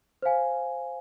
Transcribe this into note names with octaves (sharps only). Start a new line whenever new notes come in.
C5 F5 G#5